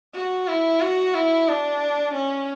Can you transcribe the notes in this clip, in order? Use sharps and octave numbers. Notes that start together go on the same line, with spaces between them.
F#4
E4
F#4
E4
D4
C#4